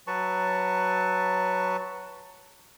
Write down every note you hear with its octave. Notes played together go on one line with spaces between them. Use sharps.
F#3 B4 A5 C#6